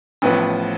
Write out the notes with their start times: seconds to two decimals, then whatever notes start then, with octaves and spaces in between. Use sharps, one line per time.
0.22 A1 A2 F3 B3 B4